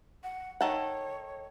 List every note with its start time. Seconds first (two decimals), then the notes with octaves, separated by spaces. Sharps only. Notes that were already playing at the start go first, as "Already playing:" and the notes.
0.23 F#5
0.61 D#3 A4 C#5 F#5